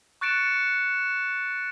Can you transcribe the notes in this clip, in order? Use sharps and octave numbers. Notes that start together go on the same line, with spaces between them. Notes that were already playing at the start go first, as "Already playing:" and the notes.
C#6 F#6 A6 C#7 D7 E7